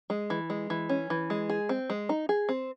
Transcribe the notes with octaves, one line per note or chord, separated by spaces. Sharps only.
G#3
E3
G#3
E3
C#4
E3
G#3
G#4
C4
G#3
D#4
G#4
C4